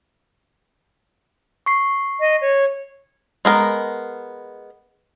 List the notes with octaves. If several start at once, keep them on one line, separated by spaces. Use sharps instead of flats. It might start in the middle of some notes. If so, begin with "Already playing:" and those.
C#6 C7
D#5
C#5
G#3 B3 A#4